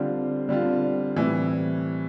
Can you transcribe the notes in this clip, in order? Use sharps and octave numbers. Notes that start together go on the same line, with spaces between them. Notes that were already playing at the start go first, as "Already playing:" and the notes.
Already playing: D3 G3 C4 F4
D3 G3 C4 F4
A2 E3 G3 C4 E4